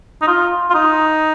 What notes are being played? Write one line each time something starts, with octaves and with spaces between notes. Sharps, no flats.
D#4
F4
F4
D#4